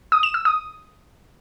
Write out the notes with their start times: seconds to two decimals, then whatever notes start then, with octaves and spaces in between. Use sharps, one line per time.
0.12 D#6
0.23 E7
0.34 E6
0.45 D#6